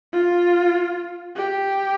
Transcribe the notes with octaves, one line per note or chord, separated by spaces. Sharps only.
F4
G4